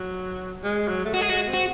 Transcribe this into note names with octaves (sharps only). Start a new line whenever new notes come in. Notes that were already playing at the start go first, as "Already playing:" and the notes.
Already playing: F#3
G#3
F#3
A3
G#3 F#4
G#4
G#3 F#4
C4
F#4